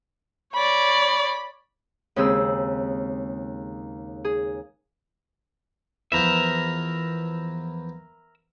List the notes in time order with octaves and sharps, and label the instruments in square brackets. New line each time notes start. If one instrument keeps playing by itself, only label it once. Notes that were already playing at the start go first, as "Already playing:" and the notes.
[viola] C#5 D5 [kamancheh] B5
[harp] D#2 C#3 G#3 C4 G#4 E6
G#4
[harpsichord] E2 F3 [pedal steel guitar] A#4 E5